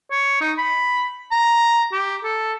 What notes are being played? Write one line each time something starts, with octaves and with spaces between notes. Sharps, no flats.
C#5
D#4
B5
A#5
G4
A4